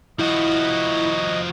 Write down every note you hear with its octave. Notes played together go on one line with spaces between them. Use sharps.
F3 E4 F#4 D#5